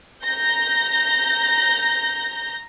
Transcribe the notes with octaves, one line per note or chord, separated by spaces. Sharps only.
A#5 G6 A#6